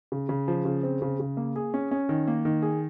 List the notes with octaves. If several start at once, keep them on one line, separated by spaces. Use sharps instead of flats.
C#3
C#3
F3
C#3
C4
C#3
C#3
A#3
G#4
C#4
C#4
D#3
A#3
D#3
G#4